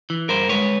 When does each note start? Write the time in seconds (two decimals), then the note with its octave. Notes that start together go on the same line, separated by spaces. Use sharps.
0.10 E3
0.29 G2 A#4 C5
0.49 G#3 B4 C#5